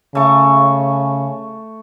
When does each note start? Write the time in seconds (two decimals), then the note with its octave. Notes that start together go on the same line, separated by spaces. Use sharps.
0.15 C#3 A3 C#6